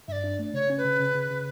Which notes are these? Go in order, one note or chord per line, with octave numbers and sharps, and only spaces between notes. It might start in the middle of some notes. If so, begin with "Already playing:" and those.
G2 D5 E5
D4
A3
C#3 C#5
C#4
B4
C#3
C#3
C#3
C#3